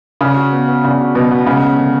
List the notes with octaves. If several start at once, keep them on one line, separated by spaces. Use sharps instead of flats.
C#3 D4
F#4
B3
B3
C#3 D4
F#4
B2 B3
B3
C#3 G#3
C#4
D3